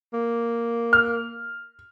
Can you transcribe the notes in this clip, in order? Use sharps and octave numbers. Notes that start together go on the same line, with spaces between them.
A#3
F6